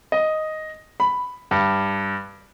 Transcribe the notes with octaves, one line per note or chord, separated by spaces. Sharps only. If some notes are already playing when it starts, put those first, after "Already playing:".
D#5
B5
G2